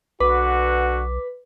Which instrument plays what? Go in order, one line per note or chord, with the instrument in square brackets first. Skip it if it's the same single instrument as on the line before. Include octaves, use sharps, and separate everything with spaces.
[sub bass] B1 [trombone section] D3 F#4 [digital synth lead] B4 [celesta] D6